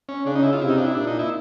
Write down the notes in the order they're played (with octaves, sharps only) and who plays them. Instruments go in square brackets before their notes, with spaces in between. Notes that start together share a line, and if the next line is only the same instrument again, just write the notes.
[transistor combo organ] C#4
[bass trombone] C#3 [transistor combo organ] D4
[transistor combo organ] D#4
E4
F4
[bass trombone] C3 [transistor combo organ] E4
[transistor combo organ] D#4
D4
E4
[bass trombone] A#2 [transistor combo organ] D4
[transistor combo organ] D#4
E4